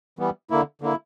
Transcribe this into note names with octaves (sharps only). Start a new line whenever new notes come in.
E3 G3 B3
D3 A#3 E4
D3 A#3 E4